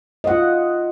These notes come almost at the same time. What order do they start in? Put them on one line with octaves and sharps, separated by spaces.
D#5 F#5 F4